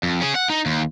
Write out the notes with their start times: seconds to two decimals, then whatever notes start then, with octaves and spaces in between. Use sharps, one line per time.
0.03 F2
0.21 C#4 G#4
0.35 F#5
0.50 D#4
0.66 D#2